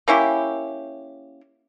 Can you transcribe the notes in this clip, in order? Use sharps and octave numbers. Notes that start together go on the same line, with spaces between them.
A#3 C#4 E4 G4